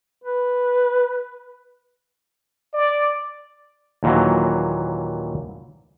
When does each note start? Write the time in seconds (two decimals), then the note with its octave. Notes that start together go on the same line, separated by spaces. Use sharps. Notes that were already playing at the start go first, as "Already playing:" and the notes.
0.24 B4
2.74 D5
4.03 D#2 A#2 E3 F#3